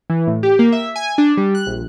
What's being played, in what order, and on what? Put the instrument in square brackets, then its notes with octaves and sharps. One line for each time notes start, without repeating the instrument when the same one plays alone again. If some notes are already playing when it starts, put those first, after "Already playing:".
[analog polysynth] E3
A2
G4
A#3
E5
G#5
D4
G3
F#6
A#1